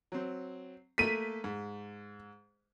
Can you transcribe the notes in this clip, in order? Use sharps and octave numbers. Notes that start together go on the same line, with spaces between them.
F#3 C4
A3 A#3 A4 B6 D#7
G#2